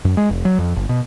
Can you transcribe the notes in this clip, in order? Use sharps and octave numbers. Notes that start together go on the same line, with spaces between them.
F#2
G#3
F1
F#3
F2
G1
B2